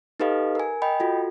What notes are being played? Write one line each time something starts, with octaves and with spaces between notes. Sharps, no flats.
D#4 G4 A4 B4 D#5 F5
A#4 G#5
D#5 G5 B5
F4 F#4 A4